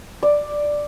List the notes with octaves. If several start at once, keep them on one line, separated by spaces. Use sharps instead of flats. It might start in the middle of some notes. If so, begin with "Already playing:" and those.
D5